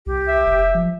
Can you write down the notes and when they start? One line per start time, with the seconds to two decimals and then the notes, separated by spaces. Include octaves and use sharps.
0.06 C2 G4
0.28 E5
0.46 F1
0.75 F3